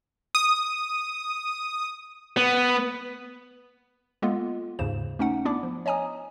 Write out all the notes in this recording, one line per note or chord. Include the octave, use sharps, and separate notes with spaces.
D#6
B3
G#3 A#3 B3 F4 A4 D#5
D#2 G#2 C#3 C5 E7
A3 C#4 D#4 F#5
B3 D4 E4 D5 D6
F3
C#5 D#5 G#5 A#5 D#6